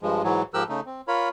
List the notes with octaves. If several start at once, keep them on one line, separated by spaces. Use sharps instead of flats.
G2 F3 G#3
G#2 E3 F#3
G#2 F3 G4 A#4 E6 F#6
C#3 A3 D#4
C4
F4 A#4 C#5 B5